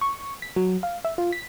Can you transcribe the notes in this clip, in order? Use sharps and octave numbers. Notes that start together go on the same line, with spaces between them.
C#6
B6
F#3
F5
E5
F4
B6